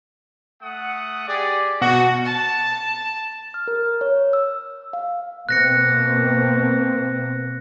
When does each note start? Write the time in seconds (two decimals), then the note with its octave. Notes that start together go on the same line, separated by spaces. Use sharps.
0.62 A3 F#5 D#6
1.28 G4 G#4 D5
1.81 B2 F#4 F#5
2.25 A5
3.54 F6
3.68 A#4
4.01 C#5
4.33 E6
4.93 F5
5.49 B2 A#3 C4 F#6 A#6 C#7